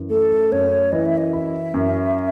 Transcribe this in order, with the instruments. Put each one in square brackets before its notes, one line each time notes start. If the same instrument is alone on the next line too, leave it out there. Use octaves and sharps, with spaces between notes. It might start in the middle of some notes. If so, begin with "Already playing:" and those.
Already playing: [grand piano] F#2 E3
[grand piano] A3 [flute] A4
[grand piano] F#2 [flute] C#5
[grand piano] E3 [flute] D#5
[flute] E5
D#5
[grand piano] E4 [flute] E5
[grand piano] F#2